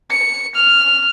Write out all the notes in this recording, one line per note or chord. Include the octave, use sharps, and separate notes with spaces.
C#7
F6